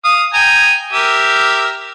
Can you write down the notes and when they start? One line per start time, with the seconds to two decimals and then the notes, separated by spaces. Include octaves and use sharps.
0.05 F5 D#6
0.33 G5 G#5 A#5
0.93 G4 A#4 E5